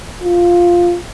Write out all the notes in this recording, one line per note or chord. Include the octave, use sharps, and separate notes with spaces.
F4